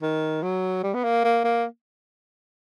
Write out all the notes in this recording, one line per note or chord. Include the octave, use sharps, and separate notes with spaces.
D#3
F#3
G3
B3
A#3
A#3
A#3